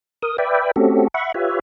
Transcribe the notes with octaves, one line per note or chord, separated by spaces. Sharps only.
A#4 D#6
B4 D5 E5 G5
A3 C4 C#4 F#4 G4 A4
E5 F#5 B5 C#6
F4 G4 B4 C#5 E5